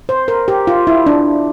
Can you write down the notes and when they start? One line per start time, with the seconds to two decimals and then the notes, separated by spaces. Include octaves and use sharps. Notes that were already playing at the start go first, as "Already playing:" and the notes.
0.09 C5
0.28 A#4
0.48 G4
0.67 F4
0.87 E4
1.06 D4